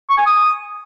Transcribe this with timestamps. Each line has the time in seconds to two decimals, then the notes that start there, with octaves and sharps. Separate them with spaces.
0.10 C#6
0.18 G#5
0.26 D#6